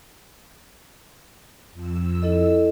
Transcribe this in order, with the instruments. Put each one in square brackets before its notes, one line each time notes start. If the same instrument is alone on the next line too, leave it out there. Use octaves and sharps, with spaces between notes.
[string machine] F2 E6
[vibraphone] E4 A4 D#5